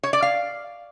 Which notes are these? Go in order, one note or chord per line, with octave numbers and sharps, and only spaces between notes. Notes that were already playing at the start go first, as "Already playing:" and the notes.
C#5
D5
F5